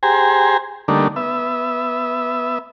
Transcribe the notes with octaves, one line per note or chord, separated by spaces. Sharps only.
G4 G#4 C5 G#5 A#5
D3 G3 A3 A#3 D4 D#4
B3 E5